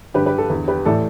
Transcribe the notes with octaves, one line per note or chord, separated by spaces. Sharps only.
G2 D3 G4 B4
G4 B4
A4
E2
D3
G4 B4
A2 E3 A4 D5